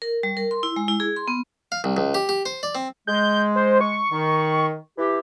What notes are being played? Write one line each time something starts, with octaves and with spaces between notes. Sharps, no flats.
A#4
G3
A#4
C6
E4
G#3
E4
G#4
C6
B3
F5
C2
C#2
G4
G4
C5
D5
C4
G#3 G6
C5
C#6
D#3
E3 G4